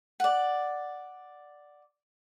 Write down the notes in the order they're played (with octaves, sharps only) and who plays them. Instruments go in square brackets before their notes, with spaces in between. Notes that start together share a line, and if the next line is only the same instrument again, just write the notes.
[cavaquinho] D5 F#5